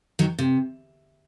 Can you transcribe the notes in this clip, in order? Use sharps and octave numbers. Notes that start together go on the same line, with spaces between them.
D#3 F#3
C3